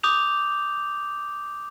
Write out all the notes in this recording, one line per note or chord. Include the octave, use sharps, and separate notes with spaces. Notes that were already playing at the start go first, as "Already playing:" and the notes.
D6 D#6 G6 F7